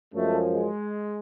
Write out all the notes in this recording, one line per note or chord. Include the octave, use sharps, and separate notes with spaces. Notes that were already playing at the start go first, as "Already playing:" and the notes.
F#2 F3 G#3 A3
G#3